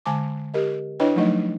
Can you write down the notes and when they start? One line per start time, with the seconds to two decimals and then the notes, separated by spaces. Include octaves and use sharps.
0.06 D3 G#3 G#5 A5 D6
0.54 G4 A#4 D#5
1.00 D4 E4 B4 C#5 D#5 G5
1.16 F3 F#3 A3 D#4 D#5